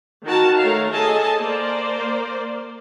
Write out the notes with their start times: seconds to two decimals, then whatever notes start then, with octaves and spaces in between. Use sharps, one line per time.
0.25 D#3 F#4 A#4 A5
0.60 A3 A#4 C#5 F5
0.92 G#4 A4 D#5 G#5 A5
1.39 A#3 C5 D5